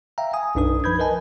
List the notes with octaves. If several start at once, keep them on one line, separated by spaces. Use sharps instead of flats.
E5 F5 G5 A#5
G#5 D#6
B1 F#2 D4 D#4 B4 D#6
F3 B4 B5 G6 G#6
A#4 B4 D#5 G#5 A5